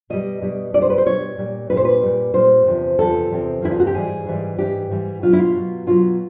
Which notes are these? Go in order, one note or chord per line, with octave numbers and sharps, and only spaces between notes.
B2 G3 D#5
B2 G3
B2 G3 D5
C5
B4
C5
B2 G3 C#5
A#2 G3
A#2 G3 B4
C5
B4
A#2 G3
A#2 G3 C5
E2 C3 F3
E2 C3 F3 A4
E2 C3 F3
E2 C3 F3 E4
F4
F#4
G4
G#2 E3 G3 G#4
G#2 E3 G3
G#2 E3 G3 G4
G#2 E3 G3
B2 F#3 F4
E4
F4
B2 F#3
B2 F#3 F4